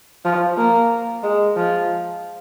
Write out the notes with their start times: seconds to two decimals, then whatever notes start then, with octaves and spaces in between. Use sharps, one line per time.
0.25 F3
0.57 A#3
1.23 G#3
1.56 F3